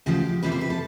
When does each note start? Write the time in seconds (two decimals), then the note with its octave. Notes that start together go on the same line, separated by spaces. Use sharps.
0.06 D2 C#3 F3 G4
0.43 F2 C3 F3 A#3 B4
0.52 C5
0.61 B4
0.70 A4